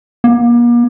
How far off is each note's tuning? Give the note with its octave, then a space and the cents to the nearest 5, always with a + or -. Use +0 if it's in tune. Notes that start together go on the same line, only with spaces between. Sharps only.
A#3 +40